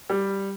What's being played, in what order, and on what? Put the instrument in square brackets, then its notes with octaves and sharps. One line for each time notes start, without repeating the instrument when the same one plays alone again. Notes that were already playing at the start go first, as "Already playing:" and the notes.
[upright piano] G3